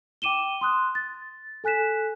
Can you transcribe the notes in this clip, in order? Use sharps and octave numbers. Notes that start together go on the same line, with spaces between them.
G5 D6 D#7 E7 G7
C6 D#6 F#6
A6
A4 G#5 F#6 B6 E7